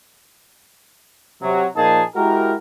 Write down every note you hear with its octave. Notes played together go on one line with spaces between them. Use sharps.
C3 F#3
A#2 F3 A#3 D#4 G#4 A5
G#3 E4 F#4 G4 A#4